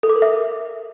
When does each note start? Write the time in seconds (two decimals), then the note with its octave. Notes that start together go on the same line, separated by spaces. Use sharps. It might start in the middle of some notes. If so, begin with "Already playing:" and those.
0.03 A4
0.10 D6
0.16 A#4
0.22 E5